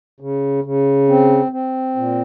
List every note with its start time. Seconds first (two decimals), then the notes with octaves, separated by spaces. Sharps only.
0.20 C#3
0.64 C#3
1.09 C4
1.52 C4
1.96 A#2